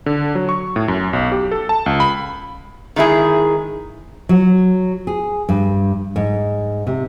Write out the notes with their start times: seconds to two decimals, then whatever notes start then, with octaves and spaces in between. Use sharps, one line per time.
0.06 D3
0.35 F#3
0.49 C#6
0.76 A2
0.88 F#2
1.13 B1
1.32 G4
1.51 A4
1.69 A5
1.86 C#2
2.00 B5
2.96 D#3 G#3 E4 G#4
4.29 F#3
5.07 G#4
5.49 G2
6.16 G#2
6.87 C3